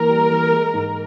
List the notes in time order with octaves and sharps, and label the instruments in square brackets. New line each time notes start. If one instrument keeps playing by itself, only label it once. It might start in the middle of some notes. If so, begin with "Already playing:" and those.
Already playing: [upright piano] E3 A#3 [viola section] A#4
[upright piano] G3
E3
G#3
G#2